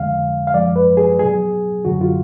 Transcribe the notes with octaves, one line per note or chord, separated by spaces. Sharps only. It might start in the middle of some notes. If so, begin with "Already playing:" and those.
Already playing: F2 D3 G#3 F5
F5
F#2 F3 G#3 D5
B4
G#4
B2 F#3 G#4
F#2 D3 F#3 F#4
F4